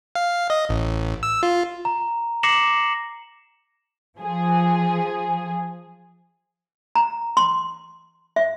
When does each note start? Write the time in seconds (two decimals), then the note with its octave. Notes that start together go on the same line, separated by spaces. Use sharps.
0.15 F5
0.50 D#5
0.69 A1
1.23 E6
1.43 F4
1.85 A#5
2.43 D6 A#6 C7 C#7 E7 F#7
4.17 F3 G#4
6.95 A#5
7.37 C6
8.36 E5